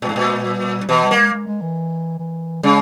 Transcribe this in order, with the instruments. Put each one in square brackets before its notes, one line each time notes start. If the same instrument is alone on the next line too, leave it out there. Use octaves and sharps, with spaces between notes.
[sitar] A#2 [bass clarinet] G#3
[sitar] G#2
A#2
[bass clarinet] G3
[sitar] B2 [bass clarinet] E3
[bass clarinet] G3
[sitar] A#3
[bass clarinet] G#3
G#3
G#3
E3
E3
[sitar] C#3 [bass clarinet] G#3